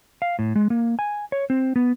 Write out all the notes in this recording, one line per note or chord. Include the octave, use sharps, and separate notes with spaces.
F5
A2
G#3
A#3
G#5
C#5
C4
B3